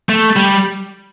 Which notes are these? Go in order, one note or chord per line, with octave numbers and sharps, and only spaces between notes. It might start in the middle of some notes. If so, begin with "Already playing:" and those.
A3
G3